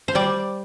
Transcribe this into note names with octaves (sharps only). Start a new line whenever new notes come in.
C5
G3 D5